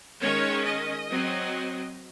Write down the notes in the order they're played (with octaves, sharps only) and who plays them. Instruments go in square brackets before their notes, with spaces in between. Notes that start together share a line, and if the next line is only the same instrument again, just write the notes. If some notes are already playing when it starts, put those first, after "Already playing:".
[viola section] D#3 G#3 C#4 C#5
D#5
F#3 C4